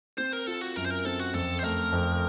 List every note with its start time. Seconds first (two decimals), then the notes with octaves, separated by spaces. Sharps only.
0.18 C4 C5
0.33 A#4
0.47 F4 A4
0.61 F#4
0.76 F#2 A#4
0.86 C5
0.90 A#4
1.05 C4 A4
1.20 F#4
1.34 F2 A4
1.59 C5
1.63 A3 A#4
1.92 F2